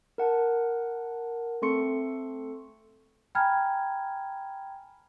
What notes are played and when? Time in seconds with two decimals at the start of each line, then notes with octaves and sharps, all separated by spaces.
0.18 A#4 F#5 A5
1.62 A3 C4 A4 C6 C#6 C#7
3.35 G5 G#5 A#5 B5 F6 G#6